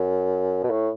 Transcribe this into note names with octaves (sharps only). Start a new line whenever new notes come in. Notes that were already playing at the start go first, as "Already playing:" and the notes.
Already playing: F#2
B2
A2